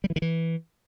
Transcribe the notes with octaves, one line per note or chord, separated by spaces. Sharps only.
G3
E3
D#3
E3